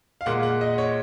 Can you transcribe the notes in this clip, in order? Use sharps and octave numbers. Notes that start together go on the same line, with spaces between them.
F5
A#2 G#3 F#5
F#5
D#5
C#5